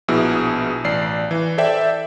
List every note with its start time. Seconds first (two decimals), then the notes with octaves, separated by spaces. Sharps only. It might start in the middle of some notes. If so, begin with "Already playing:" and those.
0.08 A#1 B2 E4 G#4 E6
0.84 A1 D5 C7
1.31 E3
1.58 A4 C5 D5 E5 G5